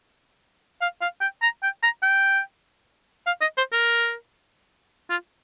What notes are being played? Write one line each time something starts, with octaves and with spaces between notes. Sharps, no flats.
F5
F5
G5
A#5
G5
A#5
G5
F5
D#5
C5
A#4
F4